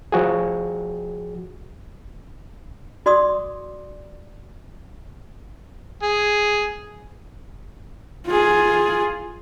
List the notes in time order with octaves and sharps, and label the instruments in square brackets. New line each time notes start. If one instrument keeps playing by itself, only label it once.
[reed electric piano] F3 F#4 G#4
[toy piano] F#4 D5 C6 D6 D#6
[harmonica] G#4
[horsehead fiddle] F4 G#4